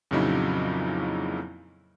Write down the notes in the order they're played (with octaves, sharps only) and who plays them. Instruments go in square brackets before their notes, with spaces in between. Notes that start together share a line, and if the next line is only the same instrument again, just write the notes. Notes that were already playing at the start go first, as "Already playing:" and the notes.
[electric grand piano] F2 A#2 C#3 F#3 D#4 E4